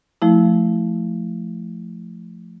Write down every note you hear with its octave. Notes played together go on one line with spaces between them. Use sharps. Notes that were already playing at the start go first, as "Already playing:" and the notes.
F3 A3 E4